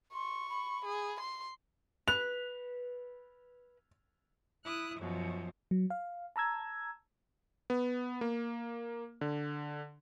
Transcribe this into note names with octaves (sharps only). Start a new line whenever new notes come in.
C6 C#6
B5
G#4
C6
B4 F#6 F7
E4 D#6 F#6
F#2 B2 F3
F#3
F5
A5 A#5 E6 G#6
B3
A#3
D3